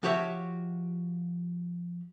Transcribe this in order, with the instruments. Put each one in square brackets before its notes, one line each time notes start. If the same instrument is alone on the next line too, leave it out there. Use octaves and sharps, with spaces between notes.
[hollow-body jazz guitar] F3 F#4 G4 C#5 D#5 E5